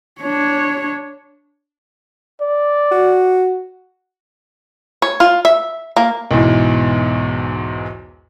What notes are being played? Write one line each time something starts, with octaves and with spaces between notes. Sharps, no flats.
D4 C#5
D5
F#4
C#5
F4
E5
A#3
B1 E2 G#2 E3